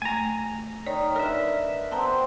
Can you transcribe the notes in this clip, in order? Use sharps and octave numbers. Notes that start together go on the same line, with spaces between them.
A3 G#5 A#5
D#3 C#5 D5
D3 A#4 B4 E5
C3 B3 C4 A5 A#5